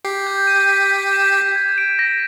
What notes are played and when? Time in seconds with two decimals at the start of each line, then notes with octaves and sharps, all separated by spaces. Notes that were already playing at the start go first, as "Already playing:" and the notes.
0.05 G4 C7
0.27 G6
0.47 D#7
0.69 B6
0.91 G6
1.13 E7
1.34 B6
1.56 G#6
1.78 D7
1.99 A#6